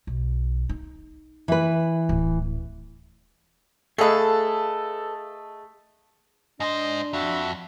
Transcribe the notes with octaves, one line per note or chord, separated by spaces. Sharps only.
B1
D#4
E3 B4
D1
A3 G#4 A4 B4 D#5 F5
G#2 D4 C5 D#5
F2 F#4 E5